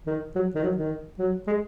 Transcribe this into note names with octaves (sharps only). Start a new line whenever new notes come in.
D#3
F#3
D#3
F#3
D#3
F#3
G#3